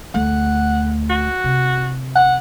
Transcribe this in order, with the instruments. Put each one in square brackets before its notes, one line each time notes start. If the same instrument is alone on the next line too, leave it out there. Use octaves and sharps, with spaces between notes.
[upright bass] D2 A3 [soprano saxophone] F#5
[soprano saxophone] F#4
[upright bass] C3
[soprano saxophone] F#5